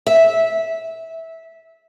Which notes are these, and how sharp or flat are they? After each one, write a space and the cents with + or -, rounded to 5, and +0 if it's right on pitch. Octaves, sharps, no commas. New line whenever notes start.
E5 -15